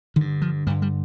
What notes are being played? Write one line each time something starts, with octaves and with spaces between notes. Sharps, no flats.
G2 D3 D#3
F3
G2 D3 G3
G3